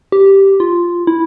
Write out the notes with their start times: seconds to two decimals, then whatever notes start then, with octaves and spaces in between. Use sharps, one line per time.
0.12 G4
0.60 F4
1.07 E4